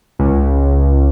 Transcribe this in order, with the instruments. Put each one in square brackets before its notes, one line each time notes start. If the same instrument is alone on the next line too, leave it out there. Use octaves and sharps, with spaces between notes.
[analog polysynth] C#2